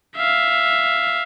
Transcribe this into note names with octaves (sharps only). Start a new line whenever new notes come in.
E5 F5